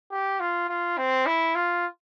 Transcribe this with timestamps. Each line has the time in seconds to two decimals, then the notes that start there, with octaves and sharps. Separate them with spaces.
0.11 G4
0.40 F4
0.69 F4
0.98 C4
1.26 E4
1.55 F4